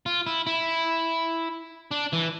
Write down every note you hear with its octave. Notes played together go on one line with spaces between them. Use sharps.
F4
E4
E4
D4
E3